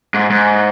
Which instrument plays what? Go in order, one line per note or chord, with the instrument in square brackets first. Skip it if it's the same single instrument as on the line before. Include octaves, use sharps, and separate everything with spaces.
[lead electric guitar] G#2
G#2